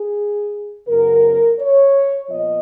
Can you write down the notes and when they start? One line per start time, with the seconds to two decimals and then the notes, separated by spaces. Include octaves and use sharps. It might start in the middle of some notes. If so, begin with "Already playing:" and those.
Already playing: G#4
0.88 F#2 C#3 F#3 B3 A#4
1.59 C#5
2.28 A#2 F3 B3 D#5